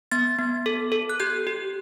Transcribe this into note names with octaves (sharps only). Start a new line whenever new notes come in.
B3 A6
B3
A4
A4
F#6
G4 G6
G4